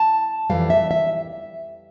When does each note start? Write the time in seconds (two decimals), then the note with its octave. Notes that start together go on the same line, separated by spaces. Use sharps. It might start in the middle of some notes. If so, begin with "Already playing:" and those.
Already playing: A5
0.50 F2 E3 G3 F5
0.70 E5
0.91 E5